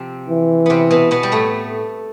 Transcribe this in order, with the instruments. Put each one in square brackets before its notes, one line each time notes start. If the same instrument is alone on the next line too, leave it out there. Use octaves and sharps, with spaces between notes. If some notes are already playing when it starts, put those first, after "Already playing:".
Already playing: [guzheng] C3 F3 C4 F4
[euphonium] E3
[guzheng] C3 B3 C4
B2 B3
B2 B3
G3
A2 A3